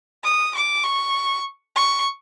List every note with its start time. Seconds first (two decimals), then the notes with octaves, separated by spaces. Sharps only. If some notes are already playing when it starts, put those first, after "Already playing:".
0.24 D#6
0.55 D6
0.84 C#6
1.76 C#6